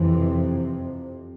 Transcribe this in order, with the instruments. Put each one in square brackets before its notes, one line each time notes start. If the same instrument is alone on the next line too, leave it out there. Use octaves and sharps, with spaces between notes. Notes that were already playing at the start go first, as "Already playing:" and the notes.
Already playing: [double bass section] F2 C3 E3